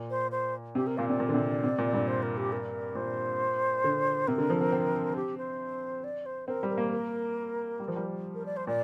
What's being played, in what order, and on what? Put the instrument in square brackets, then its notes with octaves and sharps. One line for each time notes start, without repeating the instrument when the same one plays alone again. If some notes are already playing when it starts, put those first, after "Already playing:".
Already playing: [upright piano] A#2
[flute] C5
C5
[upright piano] C3 [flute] G4
[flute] A#4
[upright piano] A#2 [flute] F5
[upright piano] C3 [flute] D5
[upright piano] A#2
D3
C3
C3
A#2
G2
[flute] C5
A#4
G4
A#4
[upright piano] A#2 [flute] C5
[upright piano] D3
[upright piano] C3 [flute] A#4
[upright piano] D3
F3
C4
C4
[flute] G4
C5
D5
C5
[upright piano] C4 [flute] A#4
[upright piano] G3
[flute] A#4
[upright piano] A#3
[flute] A#4
[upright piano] G3
F3
G3
[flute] A#4
D5
C5
[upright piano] A#2 [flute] D5